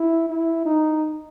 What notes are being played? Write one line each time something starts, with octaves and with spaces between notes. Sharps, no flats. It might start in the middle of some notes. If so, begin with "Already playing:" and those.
Already playing: E4
E4
D#4